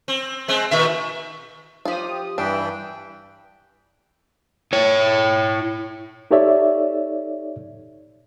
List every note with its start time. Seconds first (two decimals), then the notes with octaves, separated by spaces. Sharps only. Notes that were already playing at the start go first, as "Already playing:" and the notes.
0.08 C4
0.48 G#3 C4
0.71 A#2 D#3 E5
1.85 F3 F4 G4 D#6
2.38 G2 E3 D4 E5 G5
4.73 E4 C#5
6.31 D#4 G4 A4 C#5 D5 E5